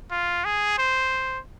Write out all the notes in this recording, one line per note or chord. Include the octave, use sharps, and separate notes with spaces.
F4
G#4
C5